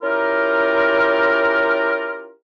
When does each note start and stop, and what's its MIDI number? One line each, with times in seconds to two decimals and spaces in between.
0.03 2.32 61
0.03 2.32 64
0.03 2.32 65
0.03 2.32 67
0.03 2.32 70